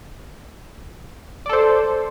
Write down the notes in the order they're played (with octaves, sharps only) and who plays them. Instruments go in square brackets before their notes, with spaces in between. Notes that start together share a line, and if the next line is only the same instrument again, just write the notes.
[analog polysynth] D5
A4
C5